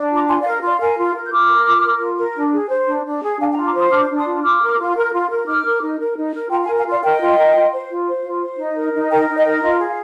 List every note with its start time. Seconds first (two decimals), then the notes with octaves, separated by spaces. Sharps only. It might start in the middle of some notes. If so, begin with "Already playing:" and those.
Already playing: D4
0.11 F4 A#5 D6
0.28 F4 G#5 C6
0.41 D5 F5
0.46 A#4
0.62 F4 D5
0.80 A#4 F5 G#5
0.98 F4
1.15 A#4
1.24 G6
1.31 F4 D6 F6
1.49 A#4
1.66 F4
1.84 A#4
2.01 F4
2.18 A#4
2.36 D4
2.53 G#4
2.70 C5
2.88 D4
3.05 D4
3.23 G#4
3.40 D4 F5 G#5
3.52 G5 A#5
3.56 F4
3.66 A#5 D6
3.74 C5 C6 D#6
3.91 D4 D6 F6
4.09 D4
4.18 C6 D#6
4.26 F4
4.43 F4 D6 F6
4.61 A#4
4.78 F4
4.96 A#4
5.13 F4
5.29 A#4
5.47 D#4 D6 F6
5.65 A#4
5.82 D#4
5.99 A#4
6.17 D#4
6.34 A#4
6.51 F4 G5 A#5
6.64 F5 G#5
6.69 A#4
6.77 F5 G#5
6.85 F4
6.90 D5 F5
7.03 A#4 D#5 G5
7.20 F4
7.38 A#4
7.55 F4
7.73 C5
7.90 F4
8.07 C5
8.24 F4
8.42 C5
8.59 D#4
8.76 A#4
8.93 D#4
9.10 A#4 G5 A#5
9.29 D#4
9.37 D#5 G5
9.45 A#4
9.63 F4 D#5
9.80 G#4
9.88 F5